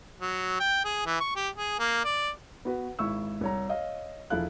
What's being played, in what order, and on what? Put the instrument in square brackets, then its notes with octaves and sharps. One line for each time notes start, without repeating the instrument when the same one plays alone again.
[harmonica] F#3
G5
G#4
E3
C#6
G4
G#4
A#3
D5
[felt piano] B3 F#4 B4
G#1 E4 C#6 E6
C2 C#5 A#5
C#5 D#5 F5
E1 F3 E4 A4 F5 F#6